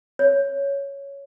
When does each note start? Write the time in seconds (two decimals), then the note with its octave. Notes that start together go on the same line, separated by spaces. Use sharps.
0.19 C#5